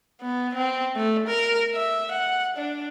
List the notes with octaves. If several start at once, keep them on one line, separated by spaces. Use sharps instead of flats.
B3
C4
A3
A#4
E5
F#5
D4